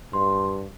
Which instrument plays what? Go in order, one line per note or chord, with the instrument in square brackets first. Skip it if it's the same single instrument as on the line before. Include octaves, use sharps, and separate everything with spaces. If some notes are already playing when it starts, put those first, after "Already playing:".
[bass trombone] G2 [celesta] C6